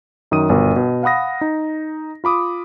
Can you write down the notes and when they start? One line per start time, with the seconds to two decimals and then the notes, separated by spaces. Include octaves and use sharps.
0.31 F#2 D#3 D#6 D#7
0.49 G1 B2 A#4
0.76 B2
1.03 F5 F#5 B5 D#6 A#6
1.41 D#4
2.24 F4 B5 D6 D#6